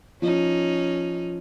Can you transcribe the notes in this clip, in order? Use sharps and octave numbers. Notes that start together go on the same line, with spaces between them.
F3 C#4 D#4